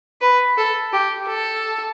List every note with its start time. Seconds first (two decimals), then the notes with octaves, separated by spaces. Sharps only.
0.21 B4
0.57 A4
0.93 G4
1.28 A4